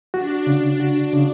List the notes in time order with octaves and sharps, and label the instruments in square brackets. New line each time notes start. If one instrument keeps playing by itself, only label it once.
[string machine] D4 [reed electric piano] F#4
[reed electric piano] C#3
F#4
C#3